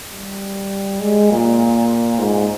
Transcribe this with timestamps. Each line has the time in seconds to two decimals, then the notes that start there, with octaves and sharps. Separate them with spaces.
0.10 G3
1.00 G#3
1.31 A#2
2.19 G#2